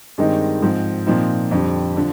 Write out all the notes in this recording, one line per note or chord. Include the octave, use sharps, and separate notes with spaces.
G2 D#3 G#3 C4 D#4
G#2 F3 C4
A#2 F3 C4 D#4
F2 D3 G3
D3 F3